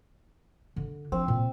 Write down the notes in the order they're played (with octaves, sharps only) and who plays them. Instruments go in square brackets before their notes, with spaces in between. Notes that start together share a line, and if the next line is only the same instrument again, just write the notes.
[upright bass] D3
[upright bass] F3 D4 [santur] C4
[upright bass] A#2